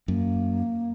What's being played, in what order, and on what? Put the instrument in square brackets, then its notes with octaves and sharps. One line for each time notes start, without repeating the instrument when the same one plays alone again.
[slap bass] F#2 [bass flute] A#3